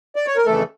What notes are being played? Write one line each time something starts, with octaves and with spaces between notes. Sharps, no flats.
D5
C#5
A#4
F2 C#3 E3 A3 A4